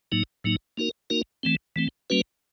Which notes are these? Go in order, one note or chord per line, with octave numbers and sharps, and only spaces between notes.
A2 F#3 A#3 D#4
A2 F#3 A#3 D#4
A#3 D#4 F#4 A#4
A#3 D#4 F#4 A#4
E3 A3 C4
E3 A3 C4
G3 A#3 C#4 F#4 B4